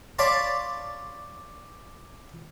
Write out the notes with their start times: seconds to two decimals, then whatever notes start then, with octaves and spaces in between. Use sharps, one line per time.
0.19 C#5 D5 F5 A5 B5 C6